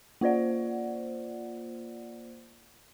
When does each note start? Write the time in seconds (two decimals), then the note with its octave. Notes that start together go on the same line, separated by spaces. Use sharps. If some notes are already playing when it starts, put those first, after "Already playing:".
0.21 A#3 F4 C5 D5 F#5